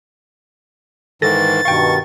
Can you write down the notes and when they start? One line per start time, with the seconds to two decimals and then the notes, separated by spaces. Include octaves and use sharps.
1.22 G#2 D#3 E3 A4 A6 A#6
1.65 G2 B2 D#3 F5 G5 C#6